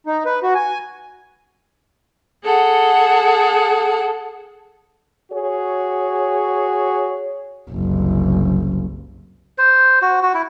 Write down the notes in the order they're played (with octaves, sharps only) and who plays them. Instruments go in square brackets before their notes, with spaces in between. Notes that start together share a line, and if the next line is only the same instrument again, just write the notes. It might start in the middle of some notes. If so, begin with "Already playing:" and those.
[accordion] D#4
B4
F#4
G#5
[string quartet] G#4 A4 F#5
[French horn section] F#4 G#4 C#5
[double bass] F#1 C2
[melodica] C5
F#4
F#4
E4